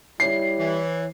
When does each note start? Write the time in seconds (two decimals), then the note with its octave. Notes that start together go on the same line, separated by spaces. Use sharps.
0.20 G3 E4 C#5 C7
0.60 E3